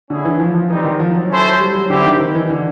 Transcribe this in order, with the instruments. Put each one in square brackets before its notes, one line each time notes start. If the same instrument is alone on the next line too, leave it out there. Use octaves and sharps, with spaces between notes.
[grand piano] D3 [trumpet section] C#4 E4 G#4
[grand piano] E3
F3
F3
[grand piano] E3 [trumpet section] G3 C4 D#4
[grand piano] D#3
F3
F#3
[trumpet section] C#4 E4 A4 C5
[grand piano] G3
F#3
[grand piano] D3 [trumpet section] C4 E4 G4
[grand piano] D#3
D#3
E3
D3